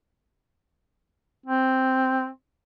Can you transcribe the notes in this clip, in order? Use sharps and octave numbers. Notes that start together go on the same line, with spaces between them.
C4